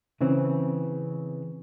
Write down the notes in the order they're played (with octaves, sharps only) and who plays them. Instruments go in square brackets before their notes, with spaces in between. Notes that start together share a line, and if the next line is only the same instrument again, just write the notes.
[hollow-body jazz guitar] C#3 E3 C4